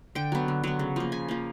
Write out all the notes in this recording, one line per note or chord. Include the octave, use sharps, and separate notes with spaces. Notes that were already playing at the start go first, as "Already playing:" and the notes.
D3 G5
F#3 B3
D3
F#3 B3
C#3
F3 A#3
C#3 G#5
F3 A#3